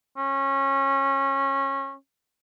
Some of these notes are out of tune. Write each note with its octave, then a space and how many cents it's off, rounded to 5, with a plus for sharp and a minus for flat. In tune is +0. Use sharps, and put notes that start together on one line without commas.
C#4 -25